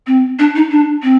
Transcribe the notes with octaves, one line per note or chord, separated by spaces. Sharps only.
C4
D4
D#4
D4
C4